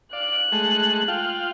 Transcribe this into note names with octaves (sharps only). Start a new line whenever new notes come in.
D5 F5 F#6
G#3 A3
F4 F5 G5